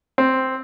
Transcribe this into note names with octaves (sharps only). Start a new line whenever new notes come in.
C4